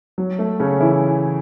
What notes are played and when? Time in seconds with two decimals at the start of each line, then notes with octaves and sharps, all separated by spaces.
0.18 F#3
0.39 A3
0.60 C#3 C#4
0.80 E3 E4